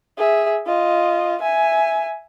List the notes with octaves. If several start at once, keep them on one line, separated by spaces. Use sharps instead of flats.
G#4 E5
F4 D#5
E5 G#5